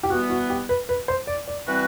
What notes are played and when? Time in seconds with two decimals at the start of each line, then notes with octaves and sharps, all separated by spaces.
0.03 G4
0.10 E3 G3 B3 F#4
0.30 F#4
0.50 G4
0.69 B4
0.89 B4
1.08 C5
1.27 D5
1.48 D5
1.67 E3 G3 C4 F#4 B4